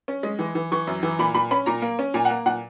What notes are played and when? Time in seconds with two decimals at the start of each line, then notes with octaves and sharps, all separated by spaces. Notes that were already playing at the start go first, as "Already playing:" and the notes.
0.08 C#4
0.23 G#3
0.39 E3
0.55 E3
0.72 E3 C#6
0.87 F#2
1.03 E3
1.19 A#2 B5
1.34 A#2 B5
1.51 C#4 B5
1.66 A#2 A#5
1.82 A#3
1.99 C#4
2.14 A#2 G#5
2.25 F#5
2.30 A#3
2.46 A#2 F#5